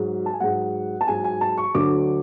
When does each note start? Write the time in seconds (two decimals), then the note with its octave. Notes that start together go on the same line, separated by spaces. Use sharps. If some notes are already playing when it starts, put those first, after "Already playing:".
Already playing: G#2 F#3
0.26 A5
0.33 G#5
0.40 G#2 F#3 F#5
1.01 A5
1.07 G#2 F#3 G#5
1.24 G#5
1.41 A5
1.57 C#6
1.75 D2 D3 F#3 D6